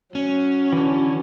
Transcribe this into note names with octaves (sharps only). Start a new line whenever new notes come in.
F#3 C#4
D3 E3